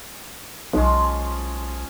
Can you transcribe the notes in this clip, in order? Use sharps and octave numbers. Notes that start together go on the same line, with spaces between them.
B1 F3 G#3 C#4